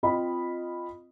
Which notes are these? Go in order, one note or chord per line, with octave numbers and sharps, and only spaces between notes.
C4 F4 D#5 B5